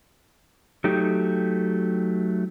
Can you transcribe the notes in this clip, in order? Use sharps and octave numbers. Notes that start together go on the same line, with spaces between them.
F#3 A3 D#4 G4